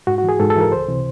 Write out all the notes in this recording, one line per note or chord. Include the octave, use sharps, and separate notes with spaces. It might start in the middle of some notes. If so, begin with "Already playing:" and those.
G#2 F#4
F#4
E3 G#4
G#2 A4
A4
E3 A#4
C#2 C5
C3 E3